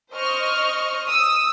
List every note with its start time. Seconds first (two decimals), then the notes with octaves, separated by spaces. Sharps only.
0.12 C5 D#5 C#6 F6
1.08 D#6 E6